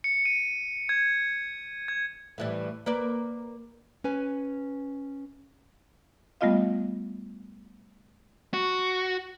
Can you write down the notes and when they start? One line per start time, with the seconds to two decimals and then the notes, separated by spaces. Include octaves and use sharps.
0.04 C#7
0.26 D#7
0.89 G#6
1.88 G#6
2.38 A2 E3 G3
2.86 A#3 B4 D5
4.04 C#4 B4 G#5
6.41 G3 A3 B3 F4 D#5 F5
8.54 F#4